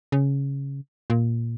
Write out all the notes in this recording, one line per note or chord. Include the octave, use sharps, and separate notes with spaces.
C#3
A#2